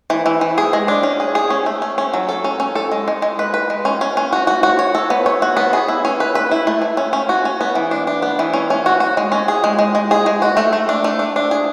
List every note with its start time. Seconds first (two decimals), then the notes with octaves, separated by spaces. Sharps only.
0.10 E3
0.26 E3
0.41 E3
0.58 G#4
0.73 G#3
0.88 D4
1.03 C#4
1.20 G#4
1.35 G#4
1.50 C#4
1.66 A3
1.82 C#4
1.98 C#4
2.14 F#3
2.29 A4
2.44 C#4
2.60 C#4
2.75 A4
2.92 G#3
3.08 G#3
3.22 G#3
3.39 B4
3.54 B4
3.70 G#3
3.85 C#4
4.01 C#4
4.17 C#4
4.33 F#4
4.47 F#4
4.63 F#4
4.79 C#5
4.95 A4
5.10 B3
5.26 C#5
5.42 F#4
5.57 B3
5.73 G#4
5.88 E4
6.05 C#4
6.20 B4
6.35 B4
6.51 E4
6.67 A3
6.82 A3
6.97 C#4
7.13 C#4
7.29 F#4
7.45 C#4
7.61 B3
7.75 E3
7.91 D4
8.07 D4
8.22 B3
8.39 E3
8.53 C#4
8.70 C#4
8.86 F#4
9.00 F#4
9.17 G#3
9.32 C#4
9.48 G#4
9.64 G#3
9.79 G#3
9.95 G#3
10.11 G#4
10.26 G#3
10.42 F#4
10.57 A3
10.73 A3
10.89 D4
11.04 A3
11.19 D4
11.36 D4
11.51 G#4